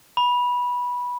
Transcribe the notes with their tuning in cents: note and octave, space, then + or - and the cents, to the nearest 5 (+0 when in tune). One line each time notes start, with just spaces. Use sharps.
B5 -15